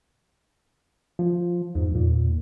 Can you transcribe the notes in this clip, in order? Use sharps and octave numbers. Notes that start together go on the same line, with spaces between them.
F3
E2 G#2
E2 A#2